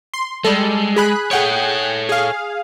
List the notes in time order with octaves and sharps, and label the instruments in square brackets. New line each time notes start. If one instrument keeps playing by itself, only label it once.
[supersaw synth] C6
[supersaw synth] G3 A4 [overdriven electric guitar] G#3
[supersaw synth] G#4 B5 F#6
[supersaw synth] G#4 F#5 G5 [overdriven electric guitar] A4 C#5
[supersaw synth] G#4 F5